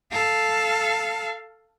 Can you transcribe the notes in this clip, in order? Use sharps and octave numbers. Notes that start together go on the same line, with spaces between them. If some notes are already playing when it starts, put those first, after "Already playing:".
A4 F5